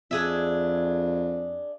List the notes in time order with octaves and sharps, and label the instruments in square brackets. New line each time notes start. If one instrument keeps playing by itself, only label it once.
[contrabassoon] F2 [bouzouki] D4 G#4 E5